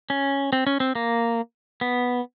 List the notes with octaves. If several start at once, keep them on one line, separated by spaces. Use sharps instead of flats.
C#4
C4
C#4
C4
A#3
B3